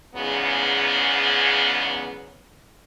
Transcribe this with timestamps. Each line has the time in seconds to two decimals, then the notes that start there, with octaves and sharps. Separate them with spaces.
0.15 E2 G#2 C#3 F#3 B3 C#4